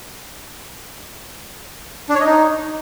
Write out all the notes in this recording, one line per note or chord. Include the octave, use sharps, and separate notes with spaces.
D4
C#5
D#5
D#4